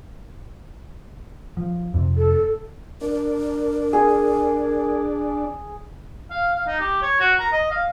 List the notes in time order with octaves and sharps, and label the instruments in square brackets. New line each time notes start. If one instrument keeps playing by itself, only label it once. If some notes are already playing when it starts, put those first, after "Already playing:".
[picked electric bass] F3
F2 C3
[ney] A4
[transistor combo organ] D4 [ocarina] A#4
[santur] G#4
[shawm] F5
F5
D#4
G4
C#5
F#4
A#5
D#5
F5